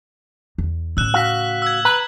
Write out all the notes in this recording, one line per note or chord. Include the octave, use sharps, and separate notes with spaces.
E2
A2 C#3 E6 F#6 E7
F#4 F5 E6 B6
E6 G#6
B4 A#5